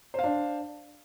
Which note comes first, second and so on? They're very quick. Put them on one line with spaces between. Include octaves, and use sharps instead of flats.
C5 F5 D4